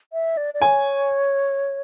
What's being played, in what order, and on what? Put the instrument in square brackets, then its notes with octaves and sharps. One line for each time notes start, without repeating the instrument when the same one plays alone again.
[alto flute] E5
D5
D5
[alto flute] C#5 [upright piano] G#5